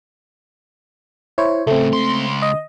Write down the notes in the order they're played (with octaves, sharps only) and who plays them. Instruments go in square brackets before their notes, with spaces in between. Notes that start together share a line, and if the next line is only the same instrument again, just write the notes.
[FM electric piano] E4 C5 C#5
[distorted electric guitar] A2 C#3 [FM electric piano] A3 C4
[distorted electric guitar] C#2 C6
[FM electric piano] D#5